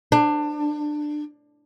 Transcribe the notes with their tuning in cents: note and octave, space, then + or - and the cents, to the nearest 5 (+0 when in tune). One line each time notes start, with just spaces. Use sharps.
D4 +20